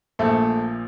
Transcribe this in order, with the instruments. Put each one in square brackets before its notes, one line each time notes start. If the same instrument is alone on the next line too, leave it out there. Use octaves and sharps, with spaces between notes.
[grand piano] A#1 A#2 F3 A3 A4